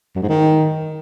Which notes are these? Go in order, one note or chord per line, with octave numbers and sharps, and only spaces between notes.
F#2
G#2
D#3